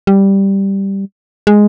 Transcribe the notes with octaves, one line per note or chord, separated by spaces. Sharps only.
G3
G#3